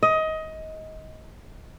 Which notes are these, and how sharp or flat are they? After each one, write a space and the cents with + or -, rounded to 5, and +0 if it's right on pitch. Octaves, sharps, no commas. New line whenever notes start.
D#5 +20